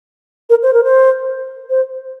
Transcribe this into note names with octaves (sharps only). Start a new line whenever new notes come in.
A#4
C5
A#4
C5
C5